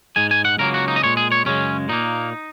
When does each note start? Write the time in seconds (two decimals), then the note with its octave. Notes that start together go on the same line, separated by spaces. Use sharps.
0.16 G#2 G#3 G#5
0.31 G#5
0.45 F#5
0.59 C#2 C#3 F#3 A#3 A#4
0.74 F#4
0.88 D#4
0.96 D#5
1.03 A#2 G#3 C#5
1.17 G#4
1.32 C#5
1.45 F#2 C#3 G#3 C#4
1.89 A#2 A#3 D#4